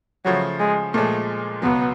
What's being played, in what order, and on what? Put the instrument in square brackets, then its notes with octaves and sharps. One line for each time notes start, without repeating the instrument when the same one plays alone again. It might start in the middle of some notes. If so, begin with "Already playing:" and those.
[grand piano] C#3 F3 A3 [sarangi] F#3
[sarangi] G#3
[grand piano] A#2 F3 G#3 [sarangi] A3
[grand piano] C#2 B2 F#3 [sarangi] B3